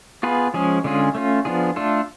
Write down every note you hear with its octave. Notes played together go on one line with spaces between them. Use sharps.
B3 F4 G#4 B4
F3 G#3 C#4 G#4
D3 G#3 C#4 F4 G#4
A3 C#4 F4
F3 B3 D4 F4 G#4
A3 D4 F4 A4